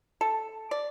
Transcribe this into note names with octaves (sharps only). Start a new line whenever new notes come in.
A4
D5